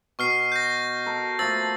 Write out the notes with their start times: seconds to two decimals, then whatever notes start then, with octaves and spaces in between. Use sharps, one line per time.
0.19 B2 C#6 F6 C7
0.52 G6 A#6
1.06 A4 A#4
1.39 F3 A3 A#3 E6 A6